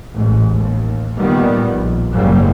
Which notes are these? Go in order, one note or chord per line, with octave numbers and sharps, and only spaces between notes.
A1 G#2
D#2
A#2 D#3 G3 B3
A#1
F#1 G#2 F#3 G3 A#3